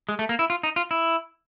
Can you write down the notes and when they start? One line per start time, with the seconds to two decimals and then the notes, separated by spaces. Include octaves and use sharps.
0.09 G#3
0.19 A3
0.29 A#3
0.39 E4
0.50 F4
0.63 D#4
0.76 F4
0.91 E4